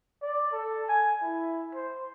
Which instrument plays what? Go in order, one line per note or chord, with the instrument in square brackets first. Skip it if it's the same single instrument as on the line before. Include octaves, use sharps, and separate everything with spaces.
[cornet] D5
A4
G#5
E4
C5